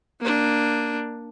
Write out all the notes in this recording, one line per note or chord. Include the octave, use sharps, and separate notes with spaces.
A#3 D4